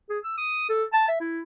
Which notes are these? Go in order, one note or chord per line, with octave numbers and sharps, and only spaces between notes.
G#4
E6
D#6
A4
A5
E5
E4